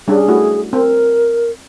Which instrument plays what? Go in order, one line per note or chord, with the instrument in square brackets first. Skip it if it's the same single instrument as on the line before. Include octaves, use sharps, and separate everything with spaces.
[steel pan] G3 C#4 D4 [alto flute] G#4
[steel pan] A3 E4 F#4
[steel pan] C4 [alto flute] A#4